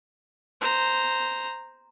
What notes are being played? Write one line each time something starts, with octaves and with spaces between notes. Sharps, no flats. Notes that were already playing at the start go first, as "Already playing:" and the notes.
C5 A#5